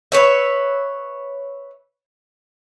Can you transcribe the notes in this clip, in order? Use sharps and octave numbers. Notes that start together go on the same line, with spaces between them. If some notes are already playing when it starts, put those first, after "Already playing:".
B4 C#5 E5